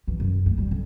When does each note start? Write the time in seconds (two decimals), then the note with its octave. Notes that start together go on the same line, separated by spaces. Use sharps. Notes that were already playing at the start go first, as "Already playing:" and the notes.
0.08 E3
0.20 F#2
0.46 A3
0.58 G3
0.71 D3